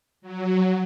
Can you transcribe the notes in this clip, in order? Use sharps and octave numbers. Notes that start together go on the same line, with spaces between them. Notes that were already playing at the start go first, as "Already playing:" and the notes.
F#3